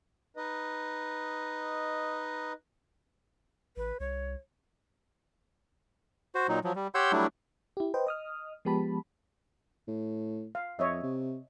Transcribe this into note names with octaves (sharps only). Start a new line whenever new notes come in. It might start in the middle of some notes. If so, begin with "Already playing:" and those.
D#4 B4 D#5
A1 B4
C2 C#5
F#4 C5
A#2 F#3 D#4
F3 F#3
G3
G4 C#5 F#5 C6 E6 G6
F#3 G3 A3 D4 E4
E4 G4
B4 C5 D#5 G5
D#5 D#6 F6
F3 G#3 B3 G4 A5 B5
A2
F5
F2 C#5 D#5 E5
C3